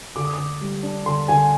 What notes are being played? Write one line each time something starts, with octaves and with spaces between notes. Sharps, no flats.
D3 D6
D#6
D3 D6
G3
D4
D3 C6
D3 G#5